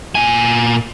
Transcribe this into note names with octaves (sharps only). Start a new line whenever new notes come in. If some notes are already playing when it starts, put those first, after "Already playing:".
A#2 G#5